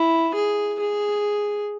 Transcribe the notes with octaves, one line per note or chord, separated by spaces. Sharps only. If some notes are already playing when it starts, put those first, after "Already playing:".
Already playing: E4
G#4
G#4